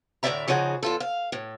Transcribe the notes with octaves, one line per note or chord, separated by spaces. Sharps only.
D2 A2 G#3 D5 E5 A#5
C#3 F3 D#4 F#4 G#4
E2 F4 A4
F5
A2